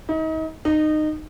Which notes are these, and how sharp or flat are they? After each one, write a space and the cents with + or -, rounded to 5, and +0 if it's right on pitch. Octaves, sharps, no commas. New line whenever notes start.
D#4 +35
D#4 -20